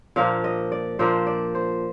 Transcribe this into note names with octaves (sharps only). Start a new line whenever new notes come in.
A#2 F3 A#3 D4 F5
D#5
D5
A#2 F3 A#3 D4 C5
D5
C5